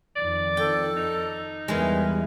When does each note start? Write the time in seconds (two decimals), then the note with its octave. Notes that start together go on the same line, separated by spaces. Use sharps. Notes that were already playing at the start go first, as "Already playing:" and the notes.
0.16 F2 D#3 D5
0.57 A4 G5
0.97 D#4
1.68 E2 E3 G3 G#3 A#4